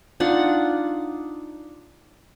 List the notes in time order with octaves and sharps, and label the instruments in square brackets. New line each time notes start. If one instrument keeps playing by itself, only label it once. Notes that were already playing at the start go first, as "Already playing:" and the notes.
[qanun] D4 D#4 F4 F#5